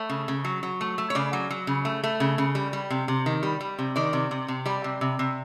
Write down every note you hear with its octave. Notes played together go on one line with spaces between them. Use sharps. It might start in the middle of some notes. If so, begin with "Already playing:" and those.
Already playing: A3 C#5
C#3
C#3
F#3
F#3
A3
A3
C#5
C#3 D5
F#3
F#3
C#3
A3
A3
C#3
C#3
G3
G3
C3
C3
D#3
G3
G3
C3
D#3 D5
C3
C3
C3
G3 D5
C3
C3
C3